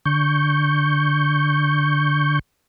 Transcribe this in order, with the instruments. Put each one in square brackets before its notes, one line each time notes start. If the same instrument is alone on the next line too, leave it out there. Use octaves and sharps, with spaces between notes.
[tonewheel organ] D3 C#6 G6